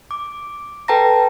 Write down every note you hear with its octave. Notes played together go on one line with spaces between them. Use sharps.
D6
A4 B4 G5 A5 A#5 A#6